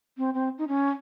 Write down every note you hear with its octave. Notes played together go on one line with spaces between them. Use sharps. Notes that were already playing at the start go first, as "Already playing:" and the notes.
C4
C4
D#4
C#4